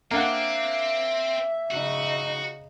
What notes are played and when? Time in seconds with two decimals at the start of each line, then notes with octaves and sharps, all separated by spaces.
0.11 A#3 C4 D4 E5 F#5
1.71 C#3 D#4 F#4